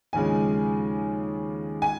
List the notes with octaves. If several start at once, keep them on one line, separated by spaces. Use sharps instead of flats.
D#2 C#3 F3 G#3 G#5
G#5